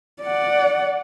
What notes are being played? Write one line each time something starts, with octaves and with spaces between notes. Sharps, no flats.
D5 F#5